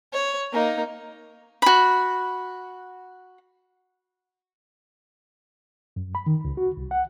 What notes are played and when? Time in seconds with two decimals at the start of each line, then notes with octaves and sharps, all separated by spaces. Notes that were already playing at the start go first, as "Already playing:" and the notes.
0.13 C#5
0.53 A#3 D#4
1.62 F#4 B5
5.96 F#2
6.15 B5
6.26 D#3
6.45 C#2
6.57 F#4
6.77 C2
6.91 F#5